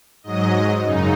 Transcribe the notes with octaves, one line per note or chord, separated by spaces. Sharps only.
G#2 F#3 D#5
F#2 C#3 D#4